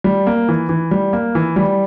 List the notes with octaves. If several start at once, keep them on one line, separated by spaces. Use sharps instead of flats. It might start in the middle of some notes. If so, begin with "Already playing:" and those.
G3
A#3
E3
E3
G3
A#3
E3
G3